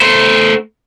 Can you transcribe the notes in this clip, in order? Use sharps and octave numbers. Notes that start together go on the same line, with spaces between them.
A3 C5